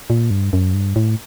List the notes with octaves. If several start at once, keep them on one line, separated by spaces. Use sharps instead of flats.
A#2
G2
F#2
G2
A2